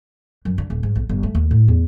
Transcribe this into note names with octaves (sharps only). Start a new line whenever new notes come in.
F#2
D3
D#1
G#2
B1
G1
A3
D#2
A2
E2